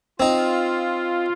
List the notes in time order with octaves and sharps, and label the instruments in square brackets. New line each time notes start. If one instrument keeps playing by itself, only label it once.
[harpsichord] C4 D#4 [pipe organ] F4